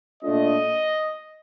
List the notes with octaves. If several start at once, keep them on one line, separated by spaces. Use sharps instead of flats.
A#2 A3 D4 F4 D#5